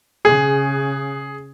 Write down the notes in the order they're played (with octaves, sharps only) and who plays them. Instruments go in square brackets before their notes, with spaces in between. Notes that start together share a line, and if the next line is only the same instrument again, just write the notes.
[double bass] C#3 [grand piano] G#4